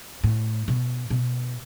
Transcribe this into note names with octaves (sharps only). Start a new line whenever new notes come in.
A2
B2
B2